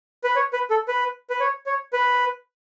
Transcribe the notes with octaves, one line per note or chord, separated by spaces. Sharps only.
B4
C#5
B4
A4
B4
B4
C#5
C#5
B4